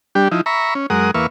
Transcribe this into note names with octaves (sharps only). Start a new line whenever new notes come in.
G3 D4 G4
F3 D#4 E4
E5 A#5 B5 C#6
C#4
F#2 G#3 A#4 F#5 D#6
E2 A#3 B4 E5 F5 C#6